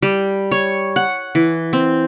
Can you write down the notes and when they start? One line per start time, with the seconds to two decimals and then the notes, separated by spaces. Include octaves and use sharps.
0.02 G3
0.51 C#5
0.96 F#5
1.35 E3
1.73 C4